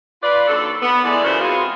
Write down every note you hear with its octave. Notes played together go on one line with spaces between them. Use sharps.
F4 B4 D5
D#2 F#3 D4 A4
B3
E3 G#3 A3 A4 D5
C#3 E3 F4 F#4 A#4 C5
G#3 B3 C4 F4 F#4 G#4